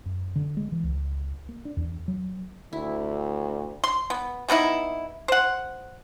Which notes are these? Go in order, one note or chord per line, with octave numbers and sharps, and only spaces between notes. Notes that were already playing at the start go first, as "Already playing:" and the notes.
F#2
D3
G#3
E3
C#2
A#3
D4
E2
F#3
D2 E4
C6
B3
G3 B3 D#4 E4
C5 F#5